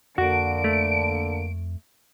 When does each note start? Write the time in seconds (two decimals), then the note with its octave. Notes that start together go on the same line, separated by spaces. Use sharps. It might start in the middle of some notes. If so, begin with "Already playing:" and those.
0.18 F2 D3 A#3 F#4 D7
0.64 A3